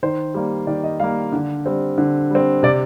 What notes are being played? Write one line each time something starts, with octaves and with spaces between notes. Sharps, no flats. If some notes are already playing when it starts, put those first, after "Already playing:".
D#3 C5
G3 A#3
D#3 D5
D#5
G3 A#3 F5
D3
G3 C4
D3
G3 C4
C3 D5